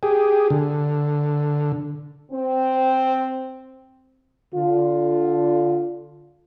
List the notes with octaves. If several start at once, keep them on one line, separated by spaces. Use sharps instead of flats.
G4 G#4
D3
C4
D3 F4